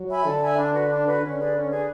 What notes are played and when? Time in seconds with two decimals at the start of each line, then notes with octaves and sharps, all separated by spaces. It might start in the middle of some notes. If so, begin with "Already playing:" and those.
Already playing: F#3
0.09 E5 G#5 B5
0.25 D3 A4
0.41 E5 G#5 B5
0.58 D4
0.74 F#4 B4
0.89 D4
1.06 F#4 B4
1.22 D3 C#4
1.38 G#4 B4 D5
1.54 C#4
1.70 G#4 B4 D5